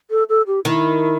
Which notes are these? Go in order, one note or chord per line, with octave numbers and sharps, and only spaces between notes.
A4
A4
G4
D#3 E4